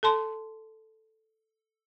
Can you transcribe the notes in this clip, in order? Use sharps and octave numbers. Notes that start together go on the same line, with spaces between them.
A4 A5 C6